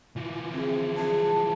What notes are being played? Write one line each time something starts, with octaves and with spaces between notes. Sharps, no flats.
E3 F3
C4 G#4
G#4 A5